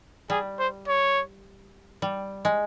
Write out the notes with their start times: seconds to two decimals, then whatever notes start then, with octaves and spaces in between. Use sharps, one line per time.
0.30 G3 G#4
0.59 C5
0.88 C#5
2.02 G3
2.45 G#3